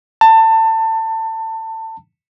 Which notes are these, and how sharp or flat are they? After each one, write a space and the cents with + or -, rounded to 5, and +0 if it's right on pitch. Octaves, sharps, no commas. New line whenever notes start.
A5 +25